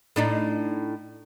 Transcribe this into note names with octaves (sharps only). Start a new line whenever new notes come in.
A2 D4 D#4